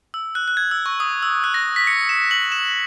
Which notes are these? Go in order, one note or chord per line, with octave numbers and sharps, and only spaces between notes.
E6
F#6
F#6
G#6
E6
C#6
D#6
E6
F#6
A#6
B6
C#7
E7
F#7
E7